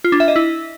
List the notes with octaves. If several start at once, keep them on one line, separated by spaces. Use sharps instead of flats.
F4
D4
E5
D#5
E4